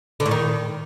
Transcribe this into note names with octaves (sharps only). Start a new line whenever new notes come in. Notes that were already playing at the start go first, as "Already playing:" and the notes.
D3
A2
D#3